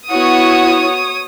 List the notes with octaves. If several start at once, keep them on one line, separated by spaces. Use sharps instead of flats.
B3 E4 F#4 C#5 D#6